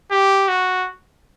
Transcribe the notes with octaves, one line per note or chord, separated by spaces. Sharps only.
G4
F#4